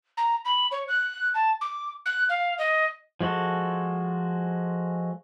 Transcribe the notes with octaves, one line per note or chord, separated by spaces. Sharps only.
A#5
B5
C#5
F#6
A5
D6
F#6
F5
D#5
F3 G#3 F#4 A4